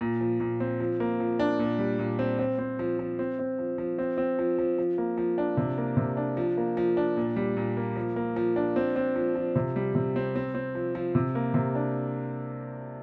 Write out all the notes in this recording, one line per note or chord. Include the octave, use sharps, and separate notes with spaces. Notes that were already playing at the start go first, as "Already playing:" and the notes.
A#2
F3
A#2
C4
F3
A#3
F3
D4
A#2
G3
A#2
C4
C4
C4
F3
F3
C4
C4
F3
F3
C4
C4
F3
F3
F3
A#3
F3
D4
C3
A#3
C3
D4
F3
A#3
F3
D4
A#2
G3
A#2
A#3
F3
A#3
F3
D4
C4
C4
F3
F3
C3
G3
C3
C4
C4
C4
F3
F3
C3
A#3
C3
D4